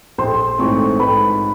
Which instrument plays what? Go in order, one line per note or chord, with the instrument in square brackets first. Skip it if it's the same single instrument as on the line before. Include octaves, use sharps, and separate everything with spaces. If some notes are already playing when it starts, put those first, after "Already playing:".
[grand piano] A#1 [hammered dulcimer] C5
[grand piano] G#2 E3 A3 C4 [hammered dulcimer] C#5
[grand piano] G#2 [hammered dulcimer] B4